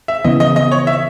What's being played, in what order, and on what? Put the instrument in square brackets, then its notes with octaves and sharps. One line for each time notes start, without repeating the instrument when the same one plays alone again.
[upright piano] E5
[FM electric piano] C#3 E3 B3 [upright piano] D#5
[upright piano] D#5
D#5
C#5
E5